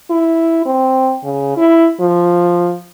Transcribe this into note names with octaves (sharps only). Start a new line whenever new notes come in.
E4
C4
C#3
E4
F3